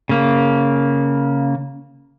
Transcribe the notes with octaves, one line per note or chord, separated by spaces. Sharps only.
C#3 A#3